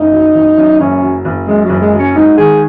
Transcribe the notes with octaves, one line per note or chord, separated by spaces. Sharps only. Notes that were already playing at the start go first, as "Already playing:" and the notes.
Already playing: F#1 D#4
F#3
F#1
F#2
F#1 C#4
F#3
F#1
F#2 G#3
F#3
F#1
G#3
F#3
C#4
G#2 D#4
D#3 G#4